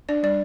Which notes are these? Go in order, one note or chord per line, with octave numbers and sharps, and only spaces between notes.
D4 D5
G3 D5